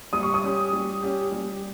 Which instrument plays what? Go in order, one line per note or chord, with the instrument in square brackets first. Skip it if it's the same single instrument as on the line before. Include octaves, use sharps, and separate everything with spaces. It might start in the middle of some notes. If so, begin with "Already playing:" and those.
[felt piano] G3 [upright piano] D#6
[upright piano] C#6
D#6
[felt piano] C#4 G4
G3
C#4 G4
G3